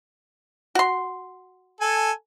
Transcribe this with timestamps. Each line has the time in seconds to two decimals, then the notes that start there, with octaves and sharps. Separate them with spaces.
0.75 F#4 C6
1.81 A4 G#5